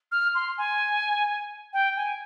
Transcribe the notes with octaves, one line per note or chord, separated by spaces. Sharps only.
F6
C6
G#5
G5
G#5